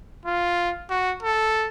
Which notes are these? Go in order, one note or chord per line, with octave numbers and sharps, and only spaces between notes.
F4
F#4
A4